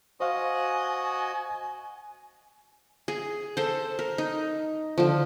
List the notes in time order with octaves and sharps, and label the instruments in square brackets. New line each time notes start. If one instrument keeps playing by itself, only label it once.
[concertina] F#4 D#5 [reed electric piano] C5 F5 [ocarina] G#5
[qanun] G#4
A4 C5
A#4
D#4
D3 F3